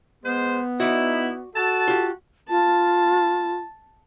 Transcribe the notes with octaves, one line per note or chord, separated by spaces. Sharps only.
G#3 B3 C5
D#4 E4 F#4 D5
F#4 A4 E5 A5
F4 G4
F4 A5